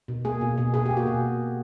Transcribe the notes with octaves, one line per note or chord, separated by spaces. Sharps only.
B2
A#3 G#4
B2
B2
B2 G#4
G4
A#3
F#4
B2